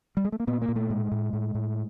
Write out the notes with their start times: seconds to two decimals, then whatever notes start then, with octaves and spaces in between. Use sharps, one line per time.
0.17 G3
0.25 G#3
0.32 A3
0.40 A#3
0.47 A#2 B3
0.62 A#3
0.68 A#2
0.76 A3
0.90 A2 G#3
1.12 A2
1.33 A2
1.55 A2